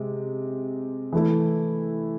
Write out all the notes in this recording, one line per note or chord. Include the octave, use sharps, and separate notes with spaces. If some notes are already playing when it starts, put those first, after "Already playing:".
Already playing: C3 G#3
E3 A3 E4